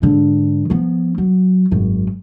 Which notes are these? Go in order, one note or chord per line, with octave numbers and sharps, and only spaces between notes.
G#2 D3
F3 B3
F#3
G#1 F#2